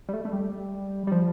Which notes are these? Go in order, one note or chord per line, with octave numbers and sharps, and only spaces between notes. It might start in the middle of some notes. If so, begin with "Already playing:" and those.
G3
A3
A3
G3
G3
F3